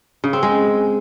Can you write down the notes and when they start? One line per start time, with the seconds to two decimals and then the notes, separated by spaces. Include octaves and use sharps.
0.24 C#3
0.33 C4
0.43 G#3